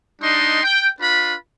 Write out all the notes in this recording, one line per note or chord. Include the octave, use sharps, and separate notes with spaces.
G3 D4 D#4 D#5 C6
G5
D4 F4 B4 B5